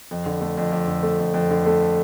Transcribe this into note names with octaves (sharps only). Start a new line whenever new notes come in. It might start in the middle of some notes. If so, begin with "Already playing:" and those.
F2
D3
A3
F2
F2
D3
A3
F2
F2
D3
A3